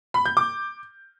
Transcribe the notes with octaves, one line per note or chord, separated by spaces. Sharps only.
B5
G6
D6